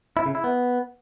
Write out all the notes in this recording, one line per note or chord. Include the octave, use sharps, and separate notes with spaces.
E4
C#3
E4
B3